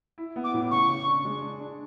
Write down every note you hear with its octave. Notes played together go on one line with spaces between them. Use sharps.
E4
B3
D6
A2
C#3 C#6
C#3
D4
G#3
D4
D4